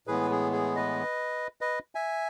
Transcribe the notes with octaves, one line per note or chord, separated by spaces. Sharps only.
A2 E3 G#3 B3 G#4 B4
G#4
G#4
B4 D#5
B4 D#5
E5 G#5